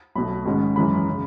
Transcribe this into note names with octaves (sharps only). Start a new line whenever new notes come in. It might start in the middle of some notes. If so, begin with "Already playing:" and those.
B1 B2 A3 B5
G#2 D#3 G#3 C#4
F#2 E3 G#3 C#4 B5
C#3